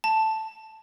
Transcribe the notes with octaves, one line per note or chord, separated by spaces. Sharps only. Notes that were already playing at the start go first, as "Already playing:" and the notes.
A5